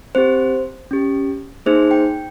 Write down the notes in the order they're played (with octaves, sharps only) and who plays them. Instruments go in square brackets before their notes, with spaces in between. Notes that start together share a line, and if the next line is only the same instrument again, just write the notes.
[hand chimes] C4 G4 C5
C#4 G4
A#3 D#4 G#4 C5
G5